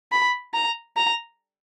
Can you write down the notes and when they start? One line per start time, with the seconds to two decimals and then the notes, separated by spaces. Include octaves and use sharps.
0.12 B5
0.54 A#5
0.97 A#5